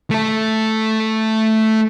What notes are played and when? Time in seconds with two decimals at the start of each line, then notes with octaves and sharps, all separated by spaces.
0.10 A3 A4